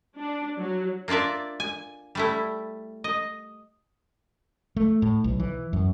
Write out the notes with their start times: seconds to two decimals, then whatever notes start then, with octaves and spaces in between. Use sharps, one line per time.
0.18 D4
0.58 F#3
1.08 A#3 D4 F4 D5 E5
1.60 G#5
2.15 G3 A3 E4
3.04 D#5
4.76 A3
5.02 A2
5.24 B1
5.40 E3
5.73 F#2